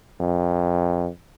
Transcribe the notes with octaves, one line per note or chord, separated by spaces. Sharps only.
F2